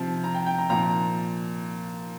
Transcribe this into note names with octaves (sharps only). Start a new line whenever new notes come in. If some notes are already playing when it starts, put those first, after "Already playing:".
Already playing: C3 F3
A#5
G5
G5
A#5
A#2 F3 A#5